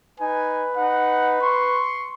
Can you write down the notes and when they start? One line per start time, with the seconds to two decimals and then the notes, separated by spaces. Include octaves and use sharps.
0.20 D#4 B4 G#5
0.75 D#4 F#5
1.42 C6 C#6